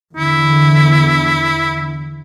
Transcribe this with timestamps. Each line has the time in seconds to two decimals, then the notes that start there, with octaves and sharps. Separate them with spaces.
0.17 E2 D3 E4